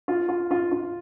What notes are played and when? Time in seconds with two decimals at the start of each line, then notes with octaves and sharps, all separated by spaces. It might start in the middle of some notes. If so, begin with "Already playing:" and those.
0.08 F4
0.29 F4
0.51 F4
0.72 F4